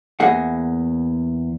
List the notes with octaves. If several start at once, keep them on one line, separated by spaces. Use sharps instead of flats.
E2 A#3 G#4 F#5